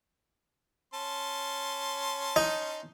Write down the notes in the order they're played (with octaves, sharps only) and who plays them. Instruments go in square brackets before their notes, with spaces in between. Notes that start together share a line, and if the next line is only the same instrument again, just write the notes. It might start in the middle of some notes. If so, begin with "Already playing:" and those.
[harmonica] C#4 A5 C6
[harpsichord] D#4